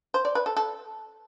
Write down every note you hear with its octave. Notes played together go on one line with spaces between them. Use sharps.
C5
D5
B4
A4
A4